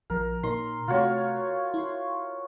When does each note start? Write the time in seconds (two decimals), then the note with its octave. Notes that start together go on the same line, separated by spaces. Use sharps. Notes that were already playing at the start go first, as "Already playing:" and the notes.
0.10 A#1 F3 A#4
0.43 A#2 D#4 A#4 C6
0.88 C3 A3 F4 F#4 C#5
1.74 E4 C6